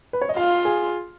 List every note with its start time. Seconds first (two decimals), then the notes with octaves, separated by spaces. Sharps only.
0.13 B4
0.21 C#5
0.29 D#5
0.36 F4 F5
0.65 G#4